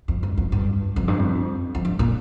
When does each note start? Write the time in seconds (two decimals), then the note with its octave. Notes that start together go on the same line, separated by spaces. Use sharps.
0.08 F2
0.23 G2
0.38 F2
0.52 G2
0.96 F2
1.08 G2
1.19 F2
1.75 F2
1.85 G2
1.99 A#2